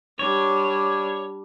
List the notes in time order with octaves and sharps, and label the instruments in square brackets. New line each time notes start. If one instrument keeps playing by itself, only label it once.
[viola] G3 D4 [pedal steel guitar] C#5